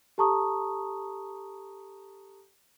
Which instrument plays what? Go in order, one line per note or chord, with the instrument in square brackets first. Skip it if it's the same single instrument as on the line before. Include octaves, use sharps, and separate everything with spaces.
[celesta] G4 A4 A5 A#5 C#6 D#6